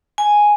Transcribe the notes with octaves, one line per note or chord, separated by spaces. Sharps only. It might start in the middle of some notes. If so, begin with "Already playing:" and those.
G#5